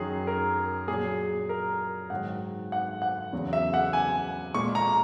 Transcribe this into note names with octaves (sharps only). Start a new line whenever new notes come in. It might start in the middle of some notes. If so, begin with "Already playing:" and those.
Already playing: F#2 D#3 F#3 G#4
A#4
A#2 F#3 G#4
A#4
G#2 D#3 F#3 F#5
F#5
F#5
E2 C#3 F#3
E5
F#5
G#5
A#2 G#3 C#6
A#5